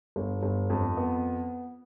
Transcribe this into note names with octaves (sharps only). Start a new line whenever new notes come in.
G1
G1
F2
B3